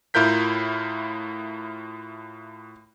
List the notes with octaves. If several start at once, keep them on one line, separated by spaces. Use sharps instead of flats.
A2 E4 F4 A#4 G6 B6